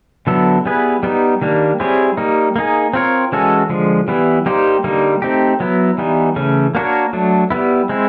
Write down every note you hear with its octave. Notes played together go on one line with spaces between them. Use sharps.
D3 F#3 B3 E4 A4
G3 B3 E4 G#4 B4
G3 B3 D#4
D#3 G3 A#3 D4
G3 C4 E4 G#4 C#5
G3 A#3 D#4
A#3 D#4 G#4
C4 F4 A#4 C#5
E3 G#3 C#4 F#4 A4
D3 F3 G#3
E3 G3 B3 E4
G3 A#3 D#4 G4 C5
D3 G3 A#3 D#4
A3 C4 D#4 G4
F#3 B3 E4
E3 G3 B3 D#4
C#3 E3 A3 C#4
A#3 D4 F#4 A#4 C#5
F#3 A3 D4
G3 B3 E4
G#3 C4 E4